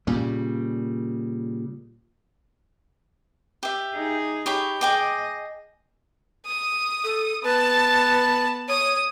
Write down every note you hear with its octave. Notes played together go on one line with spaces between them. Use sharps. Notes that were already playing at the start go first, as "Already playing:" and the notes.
A#2 C#3 G3
G4 E5
D#4 G#4
G4 C#5 B5
G#4 D#5 G5 D6
D#6
A4
B3 B4 A5
C#5 D#6